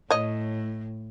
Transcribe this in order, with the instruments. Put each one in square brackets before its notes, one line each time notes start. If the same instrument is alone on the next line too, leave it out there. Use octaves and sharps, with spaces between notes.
[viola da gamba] A2 [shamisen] C#5 D#5